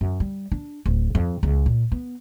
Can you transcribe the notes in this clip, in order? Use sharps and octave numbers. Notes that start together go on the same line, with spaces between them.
F#2
G3
D4
D1
F2
C#2
A#2
B3